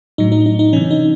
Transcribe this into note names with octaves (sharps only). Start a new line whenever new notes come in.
A2 F#3 D#4
D#4
D#4
D#4
C3 E3 C#4
D#4